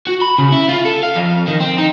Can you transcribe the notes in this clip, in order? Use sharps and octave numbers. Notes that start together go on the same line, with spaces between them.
F#4
B5
C#3
E4
F4
A4
F5
F2
D#3
C4
D#4